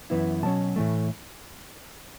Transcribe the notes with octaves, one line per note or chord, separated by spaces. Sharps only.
F#2 E3 B3 E4
B2 F#3 C#4 A5
A2 E3 A3